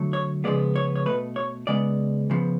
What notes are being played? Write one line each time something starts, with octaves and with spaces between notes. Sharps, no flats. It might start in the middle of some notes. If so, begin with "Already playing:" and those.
Already playing: D3 F#3 A3
C#5
C#3 F3 G#3 B3 D5
C#5
C#5
B2 A3 B4
C#5
C#3 G#3 B3 D5
C#3 F3 B3